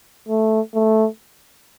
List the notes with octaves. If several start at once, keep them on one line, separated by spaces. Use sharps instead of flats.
A3
A3